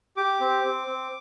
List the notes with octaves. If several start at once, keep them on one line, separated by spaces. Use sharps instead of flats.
G4 D6
C4
C4
C4